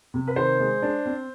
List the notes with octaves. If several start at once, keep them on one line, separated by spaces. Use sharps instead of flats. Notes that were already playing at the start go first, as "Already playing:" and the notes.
C3
B4
D#3 C5
G#3
D4
C4